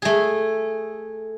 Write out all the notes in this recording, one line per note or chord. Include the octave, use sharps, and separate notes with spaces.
A3 G#4